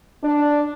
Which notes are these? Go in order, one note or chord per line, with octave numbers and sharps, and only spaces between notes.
D4